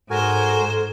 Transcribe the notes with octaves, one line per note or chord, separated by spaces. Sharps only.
G#2 F#4 A4 A#4 C5 G#5